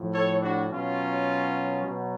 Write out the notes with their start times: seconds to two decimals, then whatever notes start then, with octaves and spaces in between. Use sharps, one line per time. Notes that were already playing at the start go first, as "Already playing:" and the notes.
Already playing: A2 F3
0.13 A4 C#5
0.41 D4 F#4
0.69 B2 F#3 C#4 F4
1.82 B2 F#3